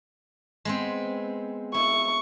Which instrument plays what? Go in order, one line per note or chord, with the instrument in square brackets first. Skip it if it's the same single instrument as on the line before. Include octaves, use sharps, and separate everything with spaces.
[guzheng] G#3 B3 C4
[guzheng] E4 [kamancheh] C#6